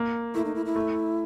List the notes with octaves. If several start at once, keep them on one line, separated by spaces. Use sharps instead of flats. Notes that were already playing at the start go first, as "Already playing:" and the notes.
Already playing: A#3
A3 E4
D#4
E4
E4
A3